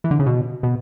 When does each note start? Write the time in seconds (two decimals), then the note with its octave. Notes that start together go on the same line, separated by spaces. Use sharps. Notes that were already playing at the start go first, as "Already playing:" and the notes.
0.04 E3
0.11 D3
0.19 C#3
0.26 B2
0.63 B2